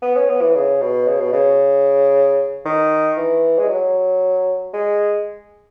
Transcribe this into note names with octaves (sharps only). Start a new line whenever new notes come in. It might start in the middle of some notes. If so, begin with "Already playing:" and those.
B3
C#4
B3
E3
C#3
B2
C#3
B2
C#3
D#3
E3
G#3
F#3
G#3